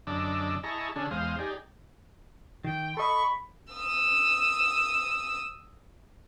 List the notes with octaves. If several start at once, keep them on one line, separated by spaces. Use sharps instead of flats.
F#2 D3 D4 D#5 D6 E6
E4 G#4 D#5 A5 A#5 C#6
D3 C#4 D4 G#4 A4
E2 G#3 C5 F5 D#6
D#4 G4 G#4 D5
D#3 G5
A4 D#5 B5 C#6
D#6 E6